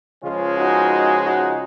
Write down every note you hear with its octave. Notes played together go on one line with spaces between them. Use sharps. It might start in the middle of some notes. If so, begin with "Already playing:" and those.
C#2 C#3 F3 G#3 C#4 F4
D#4 F#4
D#4 F#4